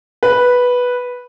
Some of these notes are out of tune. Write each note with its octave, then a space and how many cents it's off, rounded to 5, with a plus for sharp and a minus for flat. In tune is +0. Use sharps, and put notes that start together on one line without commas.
B4 -5